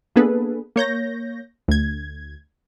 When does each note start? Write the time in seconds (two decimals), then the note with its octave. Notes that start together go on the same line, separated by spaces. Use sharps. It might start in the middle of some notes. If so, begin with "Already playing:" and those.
0.16 A#3 B3 D4 G#4 A4 B4
0.76 A#3 C#5 G6 A#6
1.68 D2 G#6